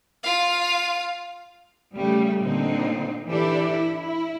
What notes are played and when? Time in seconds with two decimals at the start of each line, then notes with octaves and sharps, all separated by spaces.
0.23 F4 F5
1.95 C#3 G3 A3
2.40 A#2 D3 C4 D#4
3.27 E3 D4 E4 G4 A4 D5
3.69 E4
4.01 E4